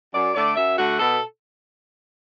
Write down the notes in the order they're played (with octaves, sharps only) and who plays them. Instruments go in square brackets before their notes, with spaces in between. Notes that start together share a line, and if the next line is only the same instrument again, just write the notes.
[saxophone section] F#2 D5
D3 A3 D5
F#2 E5
D3 A3 F#4
B2 A4